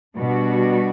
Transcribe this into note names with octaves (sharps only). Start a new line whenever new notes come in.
B2 G3 D4 F#4